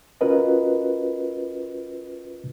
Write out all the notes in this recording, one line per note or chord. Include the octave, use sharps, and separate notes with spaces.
C#4 F4 F#4 A#4 B4 D#5